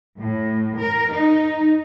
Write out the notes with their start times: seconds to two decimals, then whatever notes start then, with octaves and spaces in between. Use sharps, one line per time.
0.17 A2
0.77 A#4
1.12 D#4